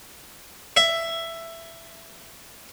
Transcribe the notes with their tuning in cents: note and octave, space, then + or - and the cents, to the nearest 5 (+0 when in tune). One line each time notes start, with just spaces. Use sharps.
E5 +10